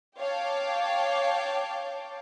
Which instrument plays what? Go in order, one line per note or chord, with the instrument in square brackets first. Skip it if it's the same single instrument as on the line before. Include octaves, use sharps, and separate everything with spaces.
[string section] C#5 F5 G5 A5 D6